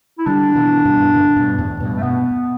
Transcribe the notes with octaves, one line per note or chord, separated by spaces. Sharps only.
E4
D3 G3 D4
B2 E3
G2 B2
A2 D3
G2 B2
E2 A2
G2 B2
A3
B2 B3